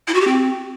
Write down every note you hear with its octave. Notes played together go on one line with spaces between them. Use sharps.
E4
F#4
G4
C4